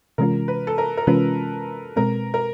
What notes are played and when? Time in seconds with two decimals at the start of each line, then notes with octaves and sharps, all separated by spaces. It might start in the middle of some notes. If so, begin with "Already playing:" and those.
0.18 C3 E3 G#3 C#4 F4 A#4
0.48 B4
0.67 A4
0.78 A#4
0.97 A#4
1.07 C3 E3 G#3 C#4 F4 B4
1.96 B2 G#3 C4 A#4
2.34 A#4